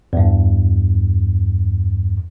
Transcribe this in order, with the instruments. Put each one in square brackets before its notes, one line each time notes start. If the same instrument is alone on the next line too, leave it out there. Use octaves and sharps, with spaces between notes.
[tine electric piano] E2 G2